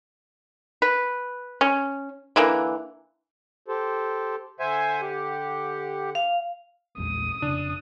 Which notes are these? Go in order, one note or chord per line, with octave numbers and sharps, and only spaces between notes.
B4
C#4
D3 E3 A#3
G4 A4 C5
D3 C5 E5 F#5 G#5
G4
F5
A#1 E2 G#3 D#6
F1 C#3 D4